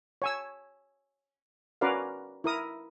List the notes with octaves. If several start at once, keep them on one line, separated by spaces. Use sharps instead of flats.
C#5 G#5 E6
C#4 F#4 A#4 B4 D5 F5
E4 A#4 D#6